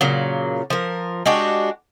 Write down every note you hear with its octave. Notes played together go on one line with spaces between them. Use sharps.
A#2 C#3 F#3
F3 A#4
G#3 D4 F#4 G4